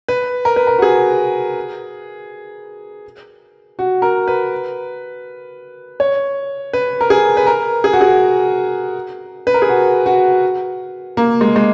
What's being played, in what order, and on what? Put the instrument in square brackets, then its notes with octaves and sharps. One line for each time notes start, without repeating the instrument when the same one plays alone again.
[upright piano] B4
A#4
B4
A#4
F#4
G#4
F#4
A#4
B4
C#5
B4
A#4
G#4
B4
A#4
G#4
F#4
G#4
B4
A#4
G#4
F#4
F#4
A#3
G#3
G#3